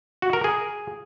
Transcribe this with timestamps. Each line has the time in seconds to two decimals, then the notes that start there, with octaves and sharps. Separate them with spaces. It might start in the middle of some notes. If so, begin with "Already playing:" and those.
0.22 F#4
0.33 A#4
0.44 G#4